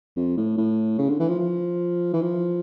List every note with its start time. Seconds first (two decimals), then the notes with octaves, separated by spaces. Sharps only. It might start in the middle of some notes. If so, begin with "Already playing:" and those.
0.17 F2
0.37 A2
0.58 A2
0.98 C#3
1.09 D3
1.20 E3
1.29 F3
1.39 F3
2.13 E3
2.22 F3